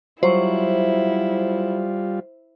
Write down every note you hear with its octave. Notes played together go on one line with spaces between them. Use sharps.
F#3 G3 E4 F4 C5